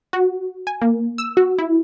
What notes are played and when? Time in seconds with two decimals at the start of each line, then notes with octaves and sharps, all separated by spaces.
0.13 F#4
0.67 G#5
0.82 A#3
1.18 E6
1.37 F#4
1.58 E4